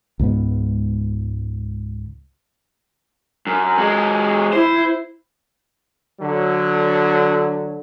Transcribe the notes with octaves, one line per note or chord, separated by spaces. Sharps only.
C#2 G#2 B3
F#2
F#3 G#3
E4 C5
D3 F#3